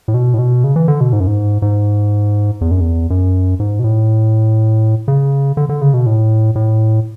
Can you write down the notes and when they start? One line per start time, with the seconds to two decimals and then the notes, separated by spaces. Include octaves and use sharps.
0.08 A2
0.14 B2
0.34 A2
0.39 B2
0.64 C#3
0.76 E3
0.88 D3
1.01 B2
1.13 G#2
1.20 F#2
1.27 G#2
1.62 G#2
2.61 E2
2.71 F#2
2.80 E2
3.10 F#2
3.60 G#2
3.79 B2
3.84 A2
5.08 C#3
5.57 D3
5.69 D3
5.81 C#3
5.94 B2
6.06 A2
6.55 A2